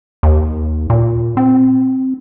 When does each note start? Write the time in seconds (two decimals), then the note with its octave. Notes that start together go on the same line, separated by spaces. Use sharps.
0.23 D#2
0.90 A#2
1.37 C4